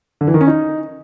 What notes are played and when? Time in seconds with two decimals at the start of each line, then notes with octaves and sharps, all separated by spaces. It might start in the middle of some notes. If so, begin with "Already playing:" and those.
0.21 D3
0.27 E3
0.34 D#3
0.41 C#4
0.47 D#4